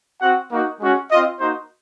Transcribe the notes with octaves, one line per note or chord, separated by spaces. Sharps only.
C4 F#4 F#5
A#3 D#4 F#4
G#3 C#4 F#4
C4 F4 D#5
A#3 D#4 F#4 C5